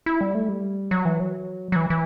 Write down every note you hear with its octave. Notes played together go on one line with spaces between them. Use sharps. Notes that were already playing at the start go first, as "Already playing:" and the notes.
E4
G3
A3
G3
F#3
E3
F#3
F#3
E3
E3